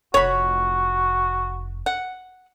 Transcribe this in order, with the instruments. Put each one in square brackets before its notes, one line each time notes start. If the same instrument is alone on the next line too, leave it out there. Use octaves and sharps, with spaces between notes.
[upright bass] F1 [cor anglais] F#4 [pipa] C#5 B5
[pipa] F#5